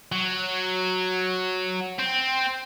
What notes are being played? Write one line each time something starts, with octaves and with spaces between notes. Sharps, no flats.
F#3
C4